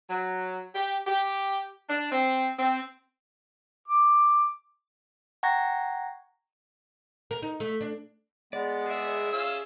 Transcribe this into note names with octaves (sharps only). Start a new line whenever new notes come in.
F#3
G4
G4
D4
C4
C4
D6
F#5 G5 A#5 C#6 G#6 A#6
A#4
D#4
A3
D4
G#3 B3 D5
G#4 E5
C#4 F4 E6